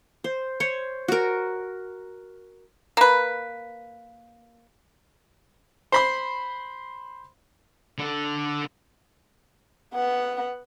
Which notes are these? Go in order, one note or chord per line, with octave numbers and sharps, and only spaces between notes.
C5
C5 C#5
F#4 A#4
A#3 B4
C5 B5 C6
D3 A4
B3 F#5